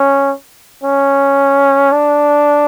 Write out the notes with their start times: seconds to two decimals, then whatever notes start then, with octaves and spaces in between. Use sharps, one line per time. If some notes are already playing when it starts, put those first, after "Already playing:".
Already playing: C#4
0.83 C#4
1.92 D4